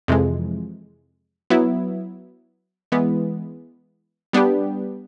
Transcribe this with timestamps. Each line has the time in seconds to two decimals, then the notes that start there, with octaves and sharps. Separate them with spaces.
0.08 F2 C3 E3 G#3
1.50 F#3 B3 E4
2.92 E3 G#3 B3
4.33 G3 B3 D4 G4